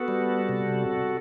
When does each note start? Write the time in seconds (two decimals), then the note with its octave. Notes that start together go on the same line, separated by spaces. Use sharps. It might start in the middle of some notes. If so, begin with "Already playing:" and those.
Already playing: B3 F#4 A4
0.08 G3
0.49 C3